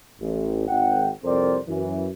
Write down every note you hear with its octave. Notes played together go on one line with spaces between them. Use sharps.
A1
G#1 F#5 G5
C2 F2 C4 A#4 C5 D5
F#2 E3